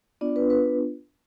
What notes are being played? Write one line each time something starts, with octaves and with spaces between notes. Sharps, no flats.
B3 D4 F4 D5
B4
B4